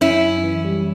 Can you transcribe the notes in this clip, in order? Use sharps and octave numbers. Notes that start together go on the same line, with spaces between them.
F#2 C#4 E4
F#2
E3
G3